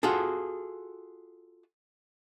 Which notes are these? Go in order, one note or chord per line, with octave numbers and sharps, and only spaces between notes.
F4 F#4 G#4 A4